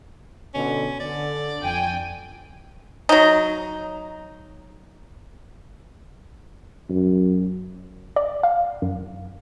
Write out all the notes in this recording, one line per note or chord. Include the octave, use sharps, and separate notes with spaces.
B2 D3 C#4
D3 D5
F2 G5 G#5
F#3 D#4
F#2
D5
F5
F#2